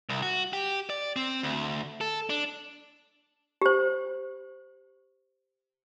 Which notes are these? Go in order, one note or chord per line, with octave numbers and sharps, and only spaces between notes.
C2
F#4
G4
D5
C4
D2
A4
D4
G4 C5